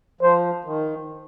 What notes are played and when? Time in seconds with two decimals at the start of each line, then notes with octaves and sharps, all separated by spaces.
0.21 F3 C5
0.65 D#3